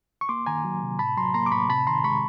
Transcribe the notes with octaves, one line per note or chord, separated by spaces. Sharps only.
C#6
A#3 C6 D6
D#3 G#5 A#5
F#3
C3
A2 A5 B5
F#3 A#5 C6
A#3 A#5 C6
D6
A2 B5 C#6
C3 A5 B5
D#3 A#5 C6
G#3 B5 C#6